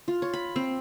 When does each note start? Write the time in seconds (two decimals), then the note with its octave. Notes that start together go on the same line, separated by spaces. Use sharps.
0.08 F4
0.22 C#5
0.33 B5
0.56 C4